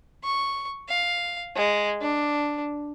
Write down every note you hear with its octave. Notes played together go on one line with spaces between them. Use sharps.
C#6
F5
G#3
D4